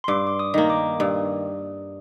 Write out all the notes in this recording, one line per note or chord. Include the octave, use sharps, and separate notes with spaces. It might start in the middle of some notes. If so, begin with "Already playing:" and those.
C6
G2 D6
D6
D#6
D#3 A#3
D6
G2 D#6